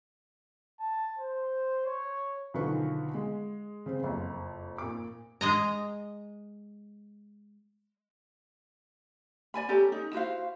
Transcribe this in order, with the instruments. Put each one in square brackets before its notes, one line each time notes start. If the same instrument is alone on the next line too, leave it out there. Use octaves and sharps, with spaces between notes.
[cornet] A5
C5
C#5
[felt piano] B1 D3 D#3 F3 B4 C#6
G#3
C#3 C4
F#1 F2
A#2 D6
[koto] G#3 D#5 A#5
[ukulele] D5 G#5 B5
C#4 G4 A4 A#5
D#4
E4 F#4 C5 F5